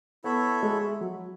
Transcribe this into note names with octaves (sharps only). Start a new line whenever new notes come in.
B3 E4 A4 C#5 E5
G#3
F#3